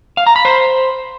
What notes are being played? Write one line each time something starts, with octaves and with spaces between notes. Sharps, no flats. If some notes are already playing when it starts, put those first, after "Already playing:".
F5
A#5
B5
C5